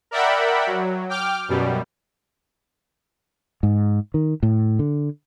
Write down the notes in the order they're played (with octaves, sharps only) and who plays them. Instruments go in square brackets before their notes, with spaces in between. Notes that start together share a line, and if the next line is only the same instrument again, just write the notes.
[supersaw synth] A#4 D5 E5 F#5 G5 B5
F#3
G5 D6 F6
F#2 B2 G3
[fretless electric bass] G#2
D#3
A2
D3